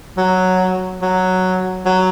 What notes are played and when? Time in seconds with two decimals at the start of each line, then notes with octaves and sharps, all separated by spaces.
0.17 F#3
1.02 F#3
1.86 F#3